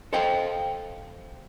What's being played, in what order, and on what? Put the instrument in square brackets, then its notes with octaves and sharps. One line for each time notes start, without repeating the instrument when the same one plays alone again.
[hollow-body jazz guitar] A4 C5 D#5 F5 G5